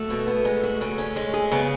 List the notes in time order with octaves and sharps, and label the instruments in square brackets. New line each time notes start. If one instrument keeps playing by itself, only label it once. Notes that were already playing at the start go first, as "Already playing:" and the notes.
Already playing: [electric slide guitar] A3 [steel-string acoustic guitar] F#4
[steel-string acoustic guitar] B2
B3
G#3
F#4
C#3
C#4
G#3
G#4
[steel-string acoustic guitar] C#3 [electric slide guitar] B3